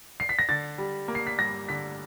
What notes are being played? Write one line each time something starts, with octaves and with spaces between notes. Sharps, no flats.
C7
B6
A#6
D3 A6
G3
A#3
C7
B6
G2 A#6
D3 B6